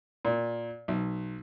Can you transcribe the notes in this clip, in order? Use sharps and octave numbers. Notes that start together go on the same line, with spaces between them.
A#2
B1